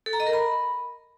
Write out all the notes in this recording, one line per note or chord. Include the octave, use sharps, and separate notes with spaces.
A4
A#5
D#5
A#4
B5